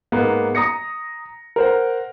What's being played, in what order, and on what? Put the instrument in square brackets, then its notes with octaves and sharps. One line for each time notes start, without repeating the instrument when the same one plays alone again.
[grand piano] G#2 A#3 B3
A#5 D#6 A#6 C#7
A#4 C5 F#5